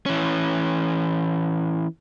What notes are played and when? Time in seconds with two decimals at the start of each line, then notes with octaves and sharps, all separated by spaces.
0.06 E3 C#4